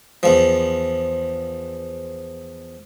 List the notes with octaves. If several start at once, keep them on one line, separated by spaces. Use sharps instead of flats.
E2 F3